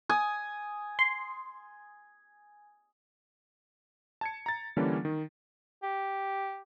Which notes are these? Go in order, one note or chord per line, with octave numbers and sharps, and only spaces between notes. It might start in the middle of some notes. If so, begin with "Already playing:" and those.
G#5 D#6
C6
A5 G#6 C#7
A#5 A6
D3 E3 G3 A#3 C#4 D4
D#3
G4